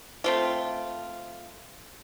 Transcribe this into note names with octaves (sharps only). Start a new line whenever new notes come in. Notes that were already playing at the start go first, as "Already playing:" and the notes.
A3 C4 F4